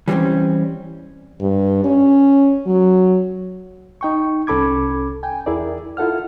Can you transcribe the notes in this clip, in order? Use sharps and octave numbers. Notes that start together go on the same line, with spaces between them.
E3 G3 A#3 C4 C#4
G2
C#4
F#3
D#4 G5 C#6
C2 C#4 A4 B5 D6 G#6
G5 G#5
E2 E4 G#4 A#4 D5
E4 F4 A4 F#5 F6